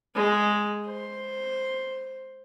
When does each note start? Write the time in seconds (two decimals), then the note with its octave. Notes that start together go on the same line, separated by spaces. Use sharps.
0.15 G#3
0.87 C5